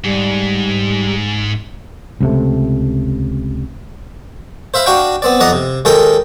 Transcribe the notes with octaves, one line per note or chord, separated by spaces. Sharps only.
G#2 G3
C#2 C3 A3
C5 E5 F5 B5
D4 F#4 F5 G5
B3 C4 D5
F2 D5 D#5 F#5 A#5
C3
D#2 G#3 A4 A#4 G5 D#6